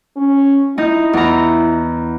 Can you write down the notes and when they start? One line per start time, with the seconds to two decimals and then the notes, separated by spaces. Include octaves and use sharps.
0.16 C#4
0.78 D#4 E4 A#5 G6
1.13 E2 A#5